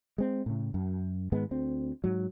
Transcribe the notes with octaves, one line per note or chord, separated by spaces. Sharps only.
G#3 C4
A2 C#3
F#2
G#2 D#3 G#3 B3
D2 C4
G#2 F#3